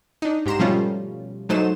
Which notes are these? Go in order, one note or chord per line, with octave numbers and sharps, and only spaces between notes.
D4 D#4
G#2 G4 A#5 C6 E7
B2 F3 G3 A3 C#4 F4
G#2 F#3 A3 D#4 C5 E7